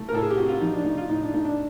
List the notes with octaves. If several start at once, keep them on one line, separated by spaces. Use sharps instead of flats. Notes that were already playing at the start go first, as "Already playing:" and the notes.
Already playing: A3
A#4
A2 A4
G#4
G4
C4 F#4
F4
F3 D#4
D4
A3 D#4
F4
A2 D#4
D4
A3 D#4
D4